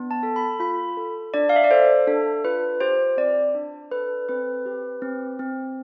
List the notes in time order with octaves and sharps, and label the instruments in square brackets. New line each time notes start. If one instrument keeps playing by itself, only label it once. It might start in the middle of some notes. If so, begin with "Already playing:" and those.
Already playing: [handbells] B3 D4
A5
A4
B5
F4 B5
A4
D4 D5
F5
E5
D5
A4 C5
D4 A4
F4 B4
G4 C5
C4 D5
D4
A4 B4
C4 B4
G4
C4
C4